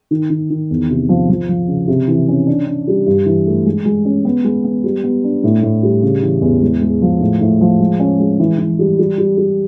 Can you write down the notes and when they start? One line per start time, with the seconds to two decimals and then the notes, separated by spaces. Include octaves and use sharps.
0.11 D#3
0.30 D#3
0.50 D#3
0.70 E2
0.90 C3
1.09 F3
1.29 F3
1.49 F3
1.68 C#3
1.88 C3
2.08 E3
2.28 C#4
2.47 D4
2.67 D4
2.87 G3
3.06 G2
3.26 E3
3.46 A3
3.66 G#3
3.85 G#3
4.05 C#4
4.25 B3
4.44 G#3
4.64 B3
4.84 G3
5.04 B3
5.24 D4
5.44 A2
5.63 A2
5.83 G3
6.02 C#3
6.22 E3
6.41 E2
6.62 G#3
6.81 G#3
7.02 F3
7.21 A2
7.41 A2
7.61 F3
7.80 G#3
8.00 C#4
8.20 G#3
8.39 E3
8.59 E3
8.79 G3
8.99 G3
9.18 G3
9.37 G3